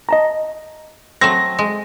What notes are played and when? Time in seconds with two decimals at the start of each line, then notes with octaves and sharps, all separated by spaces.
0.09 D#5 A5 A#5
1.21 F#3 A3 C4 A#6
1.59 G#3